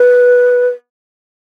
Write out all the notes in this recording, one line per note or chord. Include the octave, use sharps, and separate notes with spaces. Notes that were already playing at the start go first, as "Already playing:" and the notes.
Already playing: B4